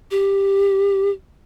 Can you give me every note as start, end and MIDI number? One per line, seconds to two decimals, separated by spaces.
0.11 1.10 67